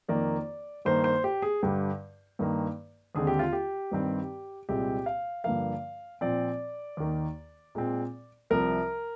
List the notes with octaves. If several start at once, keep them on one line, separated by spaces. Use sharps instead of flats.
F2 D#3 A#3 D5
G2 D#3 A#3 C5
C5
G4
G#4
G2 D3 G3
G2 D#3 A#3
D#2 D3 G#3 C4 G#4
G4
F4
G4
G2 D#3 G3 C4
C2 A#2 G#3 C4 G4
F5
G2 D3 F3 A#3 F5
A#2 F3 C4 D5
D#2 D#3 A#3
A#2 G#3 C4
C2 C3 F3 A#4